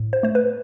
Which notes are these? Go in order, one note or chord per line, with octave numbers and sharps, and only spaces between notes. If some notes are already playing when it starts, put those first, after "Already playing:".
Already playing: A2
C5
A3 C5
B4